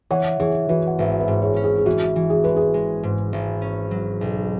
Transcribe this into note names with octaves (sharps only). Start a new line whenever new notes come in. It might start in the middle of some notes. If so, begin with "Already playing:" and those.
E3 C#5 F#5
E3 G#4 C#5
E3 F#4 B4
F#5
G#1 B4 E5
F#5
B4 E5
G#2
G#4 C#5
C#4
G#4
G#4
E3 F#4
E3
G#4
G#3 B4
G#4
G#3
G#2
G#1
C#4
F#3
B1